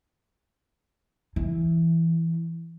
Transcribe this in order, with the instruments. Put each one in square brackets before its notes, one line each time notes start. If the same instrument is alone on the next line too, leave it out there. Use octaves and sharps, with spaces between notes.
[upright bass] E3